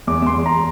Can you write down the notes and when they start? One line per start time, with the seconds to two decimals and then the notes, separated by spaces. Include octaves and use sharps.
0.07 E2 D6
0.22 E2 C6
0.36 E2
0.46 A#5